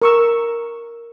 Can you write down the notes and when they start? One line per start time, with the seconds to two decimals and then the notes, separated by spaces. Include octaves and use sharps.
0.02 A#4 C#6 E6